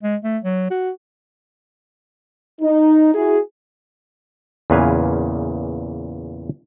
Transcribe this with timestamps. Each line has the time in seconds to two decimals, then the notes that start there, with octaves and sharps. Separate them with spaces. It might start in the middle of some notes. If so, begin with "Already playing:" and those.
0.03 G#3
0.24 A3
0.44 F#3
0.70 F#4
2.61 D#4
3.14 E4 F#4 G#4
4.70 E2 A#2 C#3 B4 F5 G#5